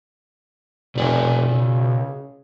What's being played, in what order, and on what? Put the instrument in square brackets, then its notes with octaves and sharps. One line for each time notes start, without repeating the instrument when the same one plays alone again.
[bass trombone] F1 [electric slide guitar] B2 D5 G#5
[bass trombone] C#3